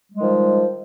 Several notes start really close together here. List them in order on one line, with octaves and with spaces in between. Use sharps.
G3 G#3 D#3 F3